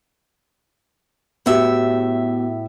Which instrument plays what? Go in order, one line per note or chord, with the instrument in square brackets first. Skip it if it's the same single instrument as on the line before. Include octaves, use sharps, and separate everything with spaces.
[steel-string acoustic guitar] A2 E5 [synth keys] B3 F#4 G4